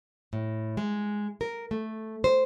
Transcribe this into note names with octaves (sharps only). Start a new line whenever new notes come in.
A2
G#3
A#4
A3
C5